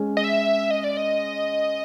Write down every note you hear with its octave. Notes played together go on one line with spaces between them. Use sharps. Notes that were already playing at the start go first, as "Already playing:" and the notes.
Already playing: G#3 C#4
D#5
E5
D#5
D5
D#5